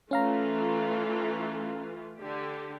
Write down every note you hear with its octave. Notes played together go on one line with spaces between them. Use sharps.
E3 A3 C#4 F4 F5 A#5
D3 G4